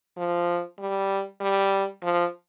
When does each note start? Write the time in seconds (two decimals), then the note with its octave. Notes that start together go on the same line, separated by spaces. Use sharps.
0.17 F3
0.79 G3
1.41 G3
2.03 F3